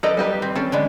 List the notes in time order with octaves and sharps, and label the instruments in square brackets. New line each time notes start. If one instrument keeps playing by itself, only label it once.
[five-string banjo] A4 B4 D#5 [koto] D5 G5 A#5
[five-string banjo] G3 G4 B4
[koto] C4
[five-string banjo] C4 [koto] C#4 A4
[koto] D3 G#3 B3